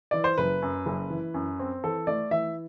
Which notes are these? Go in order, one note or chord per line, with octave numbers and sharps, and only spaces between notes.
E3 D5
C5
F#1 B4
F#2
F#1
E3
F#2
C4
E3 A4
A3 D5
E3 E5